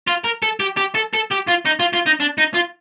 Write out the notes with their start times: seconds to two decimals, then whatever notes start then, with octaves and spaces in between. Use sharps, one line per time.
0.07 F4
0.24 A#4
0.43 A4
0.60 G4
0.77 G4
0.95 A4
1.14 A4
1.31 G4
1.48 F4
1.66 D#4
1.80 F4
1.93 F4
2.06 D#4
2.20 D4
2.38 D#4
2.54 F4